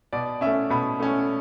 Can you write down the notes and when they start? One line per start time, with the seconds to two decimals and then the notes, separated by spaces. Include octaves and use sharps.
0.13 B2 D5
0.41 C#4 E5
0.46 A3
0.70 B2 B5
1.00 A3 C#4